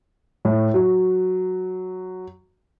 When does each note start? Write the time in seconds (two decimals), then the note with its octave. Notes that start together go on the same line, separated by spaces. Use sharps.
0.45 A2
0.74 F#3